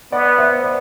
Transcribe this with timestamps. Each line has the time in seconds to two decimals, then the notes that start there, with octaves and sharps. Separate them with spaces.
0.12 B3 D5 F#5
0.38 C5 E5
0.64 B4 D5